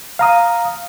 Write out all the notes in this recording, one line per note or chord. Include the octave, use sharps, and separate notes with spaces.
F5 A#5 D#6